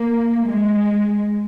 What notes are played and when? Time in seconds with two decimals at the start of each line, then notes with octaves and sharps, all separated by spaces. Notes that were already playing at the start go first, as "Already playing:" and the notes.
Already playing: A#3
0.48 G#3